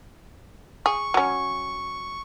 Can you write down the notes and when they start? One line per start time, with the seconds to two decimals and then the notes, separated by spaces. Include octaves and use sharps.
0.86 G#4 C#6
1.14 F#3 C#4